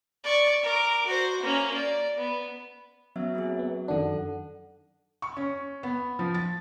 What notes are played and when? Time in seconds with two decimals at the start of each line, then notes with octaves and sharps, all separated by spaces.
0.24 D5 C#6
0.63 A#4 D6
1.07 F#4 C5
1.43 A#3 C#4
1.74 D5
2.17 B3
3.16 F#3 B3 C#4 E5
3.35 A#3 C4 G#4
3.59 B3
3.88 F#2 D#3 D4 A4 F#5
5.22 C#6
5.36 C#4
5.83 B3
6.19 F3
6.34 A6